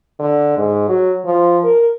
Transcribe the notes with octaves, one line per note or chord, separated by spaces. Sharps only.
D3
G#2
F#3
F3
A#4